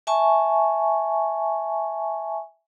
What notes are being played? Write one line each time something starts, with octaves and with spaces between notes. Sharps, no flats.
E5 G#5 A5 C#6